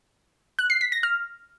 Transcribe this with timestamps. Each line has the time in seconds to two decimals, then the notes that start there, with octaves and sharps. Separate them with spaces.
0.59 F#6
0.70 C7
0.81 B6
0.92 A#6
1.03 F6